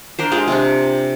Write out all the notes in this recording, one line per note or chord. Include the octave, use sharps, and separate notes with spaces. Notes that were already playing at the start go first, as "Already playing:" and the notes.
D4 A#4 C5
G#3 D4 F4 G4
C3 D4